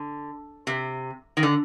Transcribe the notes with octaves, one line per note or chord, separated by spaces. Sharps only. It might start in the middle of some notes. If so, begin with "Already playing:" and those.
Already playing: D3
C3
D#3
D3